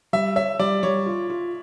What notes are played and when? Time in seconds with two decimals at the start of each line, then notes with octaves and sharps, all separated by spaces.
0.13 G3 E5
0.36 C#5 E5
0.59 G3 D5
0.83 G3 C#5
1.06 F4
1.30 F4